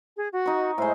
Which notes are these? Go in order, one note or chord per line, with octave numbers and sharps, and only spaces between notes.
G#4
F#4
D#4 C#6
A2 G#3 C5